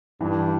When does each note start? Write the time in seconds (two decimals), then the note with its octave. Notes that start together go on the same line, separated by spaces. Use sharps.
0.21 G2 E3